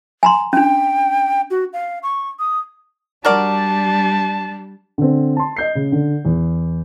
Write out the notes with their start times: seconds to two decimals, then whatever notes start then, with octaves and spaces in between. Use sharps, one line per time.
0.23 G#5 A#5 C6
0.53 C#4 D4 G5
1.51 F#4
1.73 F5
2.03 C#6
2.39 D#6
3.25 G3 D4 F#4 A#4 D5 A5
4.98 D3 C4
5.36 A5 C6
5.56 D#5 G6 C7
5.75 C#3
5.92 D3
6.25 E2